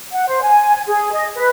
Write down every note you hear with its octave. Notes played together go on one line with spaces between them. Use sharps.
F#5
C5
G#5
G#4
D#5
B4